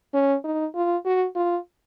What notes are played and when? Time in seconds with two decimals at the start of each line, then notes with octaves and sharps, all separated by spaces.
0.14 C#4
0.44 D#4
0.75 F4
1.05 F#4
1.36 F4